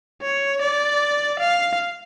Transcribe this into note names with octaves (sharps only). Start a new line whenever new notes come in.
C#5
D5
F5